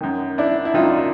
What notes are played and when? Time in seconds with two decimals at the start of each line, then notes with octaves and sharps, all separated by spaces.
0.01 F#2 D#3
0.38 D4 E4
0.65 E4
0.74 F#2 D#3 D#4 F4
0.99 F4